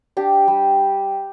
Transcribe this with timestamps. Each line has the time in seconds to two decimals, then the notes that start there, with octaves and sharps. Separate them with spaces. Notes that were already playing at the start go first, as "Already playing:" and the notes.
0.17 D4 G4
0.48 G3